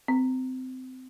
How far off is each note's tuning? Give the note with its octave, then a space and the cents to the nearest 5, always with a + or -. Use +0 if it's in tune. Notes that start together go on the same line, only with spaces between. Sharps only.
C4 -25